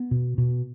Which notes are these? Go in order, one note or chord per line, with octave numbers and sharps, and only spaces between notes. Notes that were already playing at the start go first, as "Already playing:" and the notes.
Already playing: B3
B2
B2